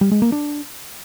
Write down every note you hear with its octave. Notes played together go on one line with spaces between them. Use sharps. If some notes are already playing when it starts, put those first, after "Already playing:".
G3
G#3
A#3
D4